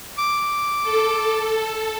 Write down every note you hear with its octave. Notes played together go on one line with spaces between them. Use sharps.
D6
A4